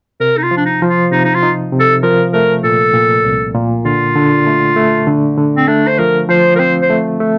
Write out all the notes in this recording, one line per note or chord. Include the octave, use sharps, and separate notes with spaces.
C3 A#4
D#4
F4
F3
D4
D#4
F3
F4
C3 D#4
D#4
F4
D#4
C3
A4
F3 A#4
A3 A#4
A#2 A4
A#2
C2
A#2
D3 F4
D3
A3
A3
D3
D3
C4
A3 D4
C5
F3 A#4
F3 C5
A#4
C4 C5
C5
A3
A3